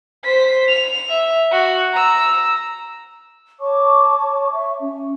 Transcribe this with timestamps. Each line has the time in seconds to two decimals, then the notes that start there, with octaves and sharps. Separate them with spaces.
0.24 C5 B6
0.68 F7
1.09 E5
1.52 F#4
1.94 A#5 E6
3.60 C#5 A5 C#6 D6
4.53 E5 C#6
4.80 C#4